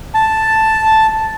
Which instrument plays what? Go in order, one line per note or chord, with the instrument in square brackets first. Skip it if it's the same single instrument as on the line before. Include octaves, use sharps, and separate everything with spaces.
[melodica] A5